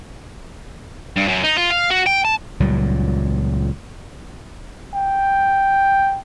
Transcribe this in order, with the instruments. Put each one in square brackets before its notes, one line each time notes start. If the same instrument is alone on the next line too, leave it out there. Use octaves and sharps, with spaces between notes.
[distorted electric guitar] G2
F#2
D#4
F4
F5
F#4
G5
A5
[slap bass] C#2 A#2 F#3 G3
[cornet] G5